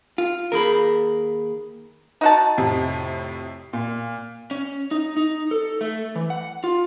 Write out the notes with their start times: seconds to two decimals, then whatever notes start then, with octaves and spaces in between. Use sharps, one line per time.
0.18 F4
0.52 D#2 G#4 A#4 B5
2.21 D#4 F#4 A5
2.58 F2 A2 C3
3.73 A#2
4.51 C#4
4.91 D#4
5.17 D#4
5.51 A4
5.81 A3
6.15 E3
6.30 F#5
6.64 F4